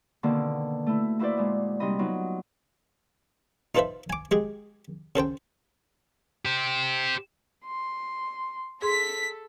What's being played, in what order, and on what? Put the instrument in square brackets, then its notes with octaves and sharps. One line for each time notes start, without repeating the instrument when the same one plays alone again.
[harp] B2 D3 D#3 A#3 C4
A3 E4
A#3 E4 F#4 B4 C5 D5
A#2 G#3
C3 G3 C4 D#4 D#5 B5
F#3 B3 D#4 F4
[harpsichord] D#4 F4 A4 B4 C5 E5
G#5 D6
G#3 G4 G#4
C#3 A4 C5 G5
[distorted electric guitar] G4 C5
[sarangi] C6
[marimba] G#4 C6 [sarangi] A4 [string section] B6